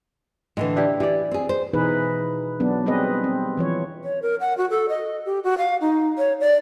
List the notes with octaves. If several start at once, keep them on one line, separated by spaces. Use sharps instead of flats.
A2 D3 E3 G#3
D4 E4 G4
E3 G4 D5
C4 G#4
C5
B2 E3 D#4 G#4 B4
F#3 B3 D4
G3 C4 G#4 B4 D#5
C4
E3 F3 C#5
C#5
A#4
F#5
F#4
A4
D#5
G4
F#4
F5
D#4
C#5
D5